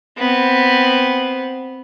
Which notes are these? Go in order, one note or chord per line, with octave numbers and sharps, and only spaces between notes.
B3 C4